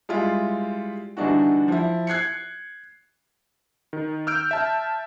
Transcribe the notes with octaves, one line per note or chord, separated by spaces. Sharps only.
G3 G#3 E4 F4
D3 E3 G3 D4 D#4 F#4
F3 E4
F#6 G#6 C7 C#7
D#3
E6 F6 G6 D7
E5 A5